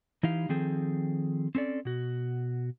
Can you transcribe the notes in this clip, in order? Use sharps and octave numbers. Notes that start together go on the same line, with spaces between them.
E3 D#4 E4 G4 F5
D#3 F3 C4 G#4 A4 G5
C4 C#4 A4 D5
B2 F#4